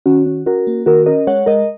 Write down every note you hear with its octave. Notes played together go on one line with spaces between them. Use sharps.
D#3 C#4 F#4
C#4
C#4 F#4 A#4
A#3
D#3 F#4 A#4
C#4 A#4 D#5
G#3 C#5 F#5
G#3 A#4 D#5